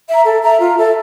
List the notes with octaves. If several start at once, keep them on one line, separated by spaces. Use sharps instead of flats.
E5 A#5
A4
E5 A#5
F4
A4 E5